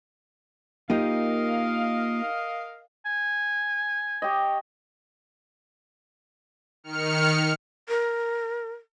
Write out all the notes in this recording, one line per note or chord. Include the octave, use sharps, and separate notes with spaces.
A#3 D#4 F4 G4 A#4 D#5 F5
G#5
G4 C#5 D#5
D#3 F6 C#7
A#4